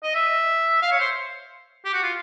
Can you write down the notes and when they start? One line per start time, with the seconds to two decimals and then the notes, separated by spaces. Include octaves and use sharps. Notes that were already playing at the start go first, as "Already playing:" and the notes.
0.03 D#5
0.15 E5
0.82 F5
0.92 C#5
1.00 C5
1.85 G4
1.93 F#4
2.03 F4